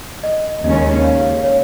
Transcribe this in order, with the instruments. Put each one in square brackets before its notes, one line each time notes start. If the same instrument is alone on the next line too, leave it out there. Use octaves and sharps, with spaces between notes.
[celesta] D#5
[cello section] D#2 C#3 G#3 C#4 [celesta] D#5
[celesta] C#5 F5
C#5